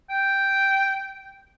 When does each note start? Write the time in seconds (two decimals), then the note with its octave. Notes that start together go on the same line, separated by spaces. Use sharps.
0.10 G5